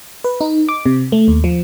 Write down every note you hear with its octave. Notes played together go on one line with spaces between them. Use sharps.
B4
D#4
D6
C3
A3
D#2
F3